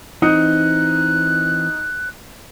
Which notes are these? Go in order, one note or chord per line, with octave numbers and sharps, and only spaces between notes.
E3 C4 D#4 D#6 F#6 C#7